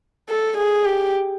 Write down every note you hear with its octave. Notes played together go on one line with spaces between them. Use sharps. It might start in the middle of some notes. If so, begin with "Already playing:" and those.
A4
G#4
G4